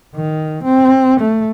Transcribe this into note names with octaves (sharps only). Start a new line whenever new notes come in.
D#3
C4
A3